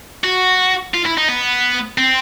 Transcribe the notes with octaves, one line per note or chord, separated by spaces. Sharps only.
F#4
F4
E4
D#4
B3
C4